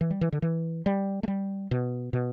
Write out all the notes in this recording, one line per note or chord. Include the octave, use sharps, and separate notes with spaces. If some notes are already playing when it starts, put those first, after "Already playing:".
E3
G3
E3
D3
E3
G3
A3
G3
B2
B2